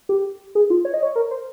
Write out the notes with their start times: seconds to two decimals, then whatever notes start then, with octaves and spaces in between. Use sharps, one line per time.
0.09 G4
0.55 G#4
0.70 F4
0.85 C#5
0.94 D#5
1.03 C#5
1.16 A#4
1.31 C5